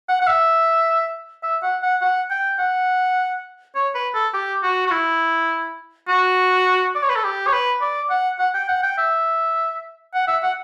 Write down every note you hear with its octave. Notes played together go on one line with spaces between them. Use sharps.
F#5
F#5
E5
E5
F#5
F#5
F#5
G5
F#5
C#5
B4
A4
G4
F#4
F#4
E4
F#4
D5
C#5
B4
A4
G4
C#5
B4
D5
F#5
F#5
G5
F#5
G5
E5
F#5
E5
F#5